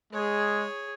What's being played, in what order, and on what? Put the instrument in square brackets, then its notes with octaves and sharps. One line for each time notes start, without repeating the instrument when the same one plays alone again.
[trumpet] G#3 [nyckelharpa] G#4 C#5